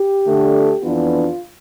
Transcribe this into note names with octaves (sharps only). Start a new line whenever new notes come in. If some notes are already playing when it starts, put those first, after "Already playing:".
Already playing: G4
D3 A3 D4
F2 E3 B3 D4 F4